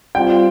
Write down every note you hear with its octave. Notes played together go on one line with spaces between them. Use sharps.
G3 C4 F4 G5